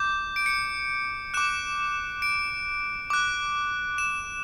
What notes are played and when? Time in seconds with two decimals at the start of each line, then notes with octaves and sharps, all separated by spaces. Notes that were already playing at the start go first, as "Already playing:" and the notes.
Already playing: D6 G6
0.36 D7
0.46 C#7
1.34 D6 F#6 E7
2.22 D7
3.10 D6 F#6
3.98 E7